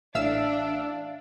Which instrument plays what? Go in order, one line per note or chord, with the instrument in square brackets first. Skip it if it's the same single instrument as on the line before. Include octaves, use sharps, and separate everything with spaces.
[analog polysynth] A1 F5 E6 [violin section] D4 [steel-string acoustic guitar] E5